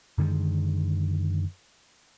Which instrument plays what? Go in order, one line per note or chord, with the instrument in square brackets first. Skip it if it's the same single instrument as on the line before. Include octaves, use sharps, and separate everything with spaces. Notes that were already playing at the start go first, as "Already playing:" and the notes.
[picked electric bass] F#2 D3 D#3 G#3